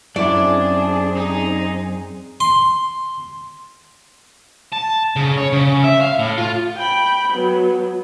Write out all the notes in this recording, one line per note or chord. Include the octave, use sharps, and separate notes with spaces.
F#2 C4 D4 E4 G#4 D5
D#4
C6
A5
C#3
C#5
C#3
E5
F5
A2
F4
G5 B5
F#3 B3